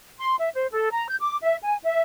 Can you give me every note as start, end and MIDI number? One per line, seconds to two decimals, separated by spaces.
0.19 0.35 84
0.39 0.49 76
0.54 0.66 72
0.70 0.91 69
0.91 1.07 82
1.08 1.16 91
1.19 1.36 86
1.42 1.56 76
1.62 1.76 80
1.83 2.02 76